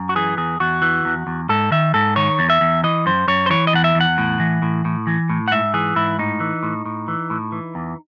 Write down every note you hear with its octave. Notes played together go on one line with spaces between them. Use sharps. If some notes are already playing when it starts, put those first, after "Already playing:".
Already playing: F#2
F#4
E3 G#4
E2 G#4
E2 F#4
E3
E2
E2
G#2 A4
D#3 E5
G#2 A4
D#3 C#5
E2
E5
E2
E3 D#5
F#2 C5
F#2 C#5
C5
E3 C#5
D#5
E2 F#5
E5
E2
F#5
A2
E3
A2
A2
E3
A2
F#5
G#2 E5
E3 G#4
G#2 E4
A2 D#4
E3
A2
A2
E3
A2
E3
E2